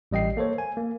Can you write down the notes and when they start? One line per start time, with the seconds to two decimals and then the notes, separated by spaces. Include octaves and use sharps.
0.11 A1 G3 D#5 G5 C7
0.37 A#3 A4 C5 C#5
0.58 G#5
0.77 A#3